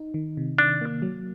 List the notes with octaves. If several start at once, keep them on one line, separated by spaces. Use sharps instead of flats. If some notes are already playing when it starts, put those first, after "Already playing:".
Already playing: D#4
D#3
C3
D#3 D4
A#3
F#3